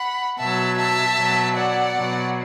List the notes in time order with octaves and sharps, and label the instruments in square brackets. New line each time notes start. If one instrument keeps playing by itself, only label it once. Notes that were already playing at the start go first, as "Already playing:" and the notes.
Already playing: [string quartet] F#5 B5
B2 F#3 E5 A5
E5 A5
B2 F#3
D5 F#5
B2 F#3